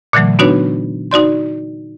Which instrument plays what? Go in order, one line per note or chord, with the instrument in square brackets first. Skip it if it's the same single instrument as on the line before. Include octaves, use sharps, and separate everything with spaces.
[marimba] A#2 D3 E3 F#3 A3
B3 D4 D#4 F#4 B4 C#5
D#4 F#4 D5 C6